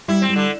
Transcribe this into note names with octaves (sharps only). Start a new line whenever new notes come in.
G3 E4
C4
G3
D3